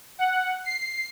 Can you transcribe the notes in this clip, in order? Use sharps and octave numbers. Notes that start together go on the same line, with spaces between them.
F#5
C7